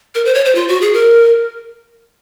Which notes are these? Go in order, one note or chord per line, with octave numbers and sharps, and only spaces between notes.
A#4
C5
C#5
C5
F4
F#4
G#4
A#4